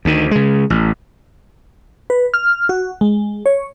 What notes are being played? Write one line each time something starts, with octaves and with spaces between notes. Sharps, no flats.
D2 D#3
C#3 G#3
A1
B4
F6
F#4
G#3
C#5